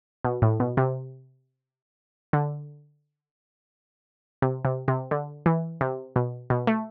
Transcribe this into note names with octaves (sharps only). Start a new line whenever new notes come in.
B2
A2
B2
C3
D3
C3
C3
C3
D3
E3
C3
B2
B2
A3